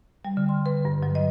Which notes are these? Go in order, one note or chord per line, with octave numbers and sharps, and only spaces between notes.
G3
D3
C6
B4
G2
F#3
D#5